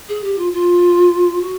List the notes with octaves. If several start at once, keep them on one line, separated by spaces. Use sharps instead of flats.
G#4
G4
F4
F4
F#4